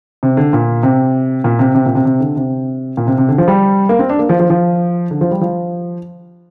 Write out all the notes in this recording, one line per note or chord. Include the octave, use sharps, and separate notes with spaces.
C3
D3
A#2
C3
A#2
C3
C3
A#2
C3
C3
D3
C3
A#2
C3
C3
D3
F3
G3
A#3
C4
D4
A#3
F3
F3
F3
D3
F3
G3
F3